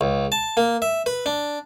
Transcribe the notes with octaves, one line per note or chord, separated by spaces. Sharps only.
C#2
A5
A#3
E5
B4
D4